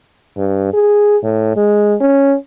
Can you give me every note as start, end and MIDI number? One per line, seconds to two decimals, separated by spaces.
0.37 0.71 43
0.73 1.17 68
1.23 1.56 45
1.56 1.95 56
2.01 2.35 61